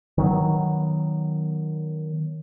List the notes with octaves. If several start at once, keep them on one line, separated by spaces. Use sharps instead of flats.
D#3 F#3 B3